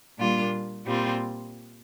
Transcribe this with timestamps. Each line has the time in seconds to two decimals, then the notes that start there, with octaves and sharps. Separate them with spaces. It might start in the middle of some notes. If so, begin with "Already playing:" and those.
0.17 A#2 G3 A#3 D4 F4
0.86 A#2 G3 C4 F4